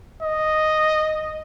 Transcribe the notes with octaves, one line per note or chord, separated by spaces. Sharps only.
D#5